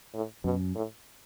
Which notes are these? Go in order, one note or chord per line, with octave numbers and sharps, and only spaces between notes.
A2
F#2 B2
A2